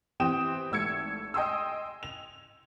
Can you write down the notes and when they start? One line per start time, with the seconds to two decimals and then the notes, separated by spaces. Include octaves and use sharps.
0.20 E3 C4 G4 G5 D#6 E7
0.71 G#1 A3 E6 G#6 C#7
1.34 D#5 G5 G#5 C6 D#6 E6
2.03 F7